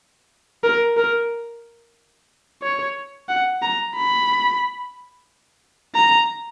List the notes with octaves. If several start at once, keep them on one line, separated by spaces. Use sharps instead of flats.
A#4
A#4
C#5
F#5
A#5
B5
A#5